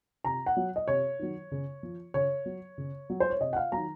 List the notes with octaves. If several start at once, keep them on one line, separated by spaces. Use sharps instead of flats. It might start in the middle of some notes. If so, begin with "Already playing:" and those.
C3 A#5
F#5
F#3
D#5
C3 C#5
D#3 F#3
C#3
F3
C#3 C#5
F#3
C#3
F#3
C5
C#5
C3 D#5
F#5
F5
D#3 F#3 A#5